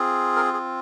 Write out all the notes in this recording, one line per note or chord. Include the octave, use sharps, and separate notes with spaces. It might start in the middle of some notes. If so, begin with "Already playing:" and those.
Already playing: C4 F4 G#4
A#4
G#4